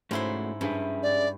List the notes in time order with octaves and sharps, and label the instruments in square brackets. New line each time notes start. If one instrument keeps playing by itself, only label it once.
[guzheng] G#2 E4 C6 [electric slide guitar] A3 C#4 F#4
[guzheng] G2 [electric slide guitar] C#4 G#4 E5
[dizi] D5